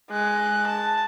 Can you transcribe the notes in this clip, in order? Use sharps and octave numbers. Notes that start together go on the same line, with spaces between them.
G#3 F#6
A5